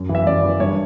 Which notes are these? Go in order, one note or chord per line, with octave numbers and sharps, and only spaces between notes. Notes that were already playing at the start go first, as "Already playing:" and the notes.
Already playing: F#2
E3
E5
F#2 D5
E3
G2 C#5